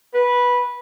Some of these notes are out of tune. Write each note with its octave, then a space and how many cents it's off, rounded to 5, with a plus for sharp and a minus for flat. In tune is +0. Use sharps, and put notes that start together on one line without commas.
B4 -10